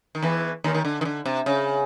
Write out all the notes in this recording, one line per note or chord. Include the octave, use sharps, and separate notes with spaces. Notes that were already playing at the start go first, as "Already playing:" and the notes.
D#3
E2 E3
D#2 D#3
D#3
D3
D#3
D3
C3
C#3